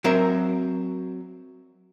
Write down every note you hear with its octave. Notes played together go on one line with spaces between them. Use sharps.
F#3 C4 A#4 E5